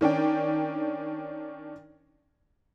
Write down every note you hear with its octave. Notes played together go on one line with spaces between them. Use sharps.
D#3 C#4 D4 G5